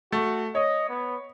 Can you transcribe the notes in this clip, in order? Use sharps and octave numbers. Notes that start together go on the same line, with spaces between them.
A3 F#4
C#5 D#5
B3